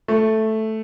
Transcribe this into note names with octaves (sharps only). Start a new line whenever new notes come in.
A3